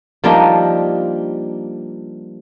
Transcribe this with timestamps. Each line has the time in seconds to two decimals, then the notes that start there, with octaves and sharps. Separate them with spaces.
0.24 F3 G3 A#3 D4 D#4 F4